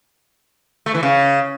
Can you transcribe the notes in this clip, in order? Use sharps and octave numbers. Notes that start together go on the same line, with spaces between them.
A3
E3
C#3